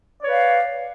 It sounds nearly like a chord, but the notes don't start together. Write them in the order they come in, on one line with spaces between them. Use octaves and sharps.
D5 C#5 B4 F5